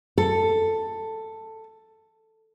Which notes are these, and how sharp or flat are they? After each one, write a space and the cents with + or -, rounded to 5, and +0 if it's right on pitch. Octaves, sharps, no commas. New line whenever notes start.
A4 +10